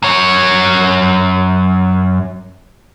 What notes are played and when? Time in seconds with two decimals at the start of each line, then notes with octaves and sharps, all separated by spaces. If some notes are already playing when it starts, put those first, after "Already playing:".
0.03 F#2 C#5